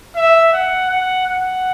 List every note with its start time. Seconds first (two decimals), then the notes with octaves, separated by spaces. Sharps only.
0.15 E5
0.52 F#5
0.90 F#5
1.27 F#5